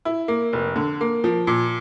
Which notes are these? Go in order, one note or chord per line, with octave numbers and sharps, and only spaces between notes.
E4
A#3
F1
D3
A#3
F3
A#2